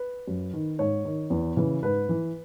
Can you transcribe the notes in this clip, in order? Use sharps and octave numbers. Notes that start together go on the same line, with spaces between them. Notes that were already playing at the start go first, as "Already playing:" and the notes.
Already playing: B4
F#2
D#3
G#2 C#5
D#3
E2
C#3 E3
G#2 B4
E3